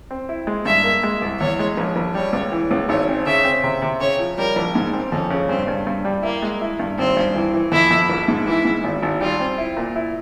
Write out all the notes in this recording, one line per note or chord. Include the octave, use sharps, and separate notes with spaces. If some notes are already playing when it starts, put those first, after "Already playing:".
C4
E4
G#3
G2 E5
A#3
G#3
C2
E2 C#5
G#3
A#1
A#1
G3 C#5
C#2
E3
C#2
G#1 C#5
C4
C#3 E5
C4
C3
C3
C#3 C#5
F3
G3 A#4
A#1
G#2
C4
F2 C#4
C#3
G2 C4
G2
G2
G3
A#3 E4
G#3
E4
G2
G#1 C4
G2
E3
E3
F2 E4
F2
A#1
G#2
E3 E4
G#2
G#1
G#1
G3 F4
C4
E4
A#2
E4